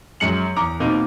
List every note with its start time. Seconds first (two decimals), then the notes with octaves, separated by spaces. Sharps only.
0.20 F#2 G#3 C#7 F#7
0.56 E2 A#5 D6
0.80 B2 A#3 C4 D#4